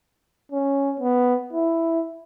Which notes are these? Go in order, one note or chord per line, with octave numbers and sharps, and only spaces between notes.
C#4
B3
E4